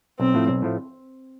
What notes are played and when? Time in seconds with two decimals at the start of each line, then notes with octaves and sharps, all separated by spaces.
0.19 B1 C4
0.34 A2 F3 A3
0.48 B1
0.62 A2 F3 A3